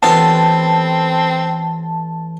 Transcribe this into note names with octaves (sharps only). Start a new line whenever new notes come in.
A1 B3 C4 F4 A4 F5 A5